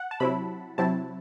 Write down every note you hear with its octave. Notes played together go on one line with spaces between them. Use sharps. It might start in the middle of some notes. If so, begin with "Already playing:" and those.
Already playing: F#5
A5
C3 F#3 C4 E4 B5
C3 F#3 C4 E4 A5